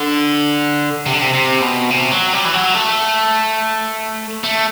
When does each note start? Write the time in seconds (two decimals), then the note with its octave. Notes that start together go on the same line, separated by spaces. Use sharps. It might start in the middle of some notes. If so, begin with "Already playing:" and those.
Already playing: D3
1.06 C3
1.13 D3
1.22 C3
1.34 C3
1.62 B2
1.90 C3
2.11 F#3
2.33 G3
2.45 E3
2.54 F#3
2.74 A3
4.44 A3